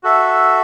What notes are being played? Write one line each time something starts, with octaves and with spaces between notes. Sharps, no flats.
F#4 A4 E5